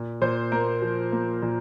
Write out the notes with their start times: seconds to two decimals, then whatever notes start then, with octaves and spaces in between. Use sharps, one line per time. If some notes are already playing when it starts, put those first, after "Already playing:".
Already playing: A#2
0.21 A#2 C5
0.52 A#3 A#4
0.82 F3
1.12 A#3
1.42 A#2